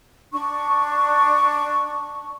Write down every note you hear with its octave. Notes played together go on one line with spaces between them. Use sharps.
D4 C#6